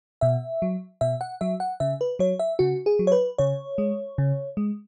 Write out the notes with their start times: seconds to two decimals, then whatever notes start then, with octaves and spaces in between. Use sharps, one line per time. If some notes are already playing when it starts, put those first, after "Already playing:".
0.21 B2 E5
0.62 F#3
1.01 B2 E5
1.21 F#5
1.41 F#3 E5
1.60 F#5
1.80 C#3 E5
2.01 B4
2.19 F#3 C#5
2.39 E5
2.59 C#3 F#4
2.86 G#4
2.99 F#3
3.07 C#5
3.12 B4
3.38 C#3 C#5
3.78 G#3
4.18 C#3
4.57 G#3